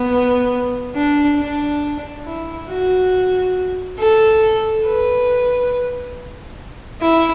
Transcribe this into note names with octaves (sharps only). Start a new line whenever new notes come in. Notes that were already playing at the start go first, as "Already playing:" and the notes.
Already playing: B3
D4
D4
E4
F#4
A4
B4
E4